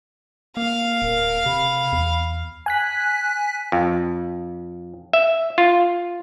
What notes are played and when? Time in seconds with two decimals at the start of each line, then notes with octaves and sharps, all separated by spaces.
0.57 A#3 F5
1.02 D1 A#4
1.46 C3 B5
1.93 E2
2.66 G#5 F#6 B6
3.72 F2
5.13 E5
5.58 F4